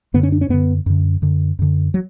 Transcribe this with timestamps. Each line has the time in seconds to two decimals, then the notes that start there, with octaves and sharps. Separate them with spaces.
0.14 F#2 D3 B3
0.23 C#4
0.32 D4
0.41 C#4
0.49 F#2 D3 B3
0.86 F#2 D3
1.22 F#2 D3
1.59 F#2 D3
1.94 F#3